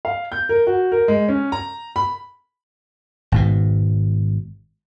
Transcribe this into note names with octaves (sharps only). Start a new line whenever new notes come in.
F5
G6
A#4
F#4
A#4
G#3
C#4
A#5
B5
G#1 G#2 B2